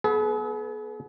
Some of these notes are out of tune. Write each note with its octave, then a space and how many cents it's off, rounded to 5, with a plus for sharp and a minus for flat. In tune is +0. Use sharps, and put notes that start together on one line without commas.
B3 -20 G#4 +45 B4 +0